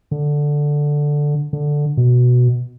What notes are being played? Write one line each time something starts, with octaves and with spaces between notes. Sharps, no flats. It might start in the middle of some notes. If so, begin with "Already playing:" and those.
D3
D3
B2